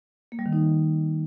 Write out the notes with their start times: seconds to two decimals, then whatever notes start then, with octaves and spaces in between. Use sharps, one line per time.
0.32 A#3
0.39 G3
0.46 D#3
0.53 D#4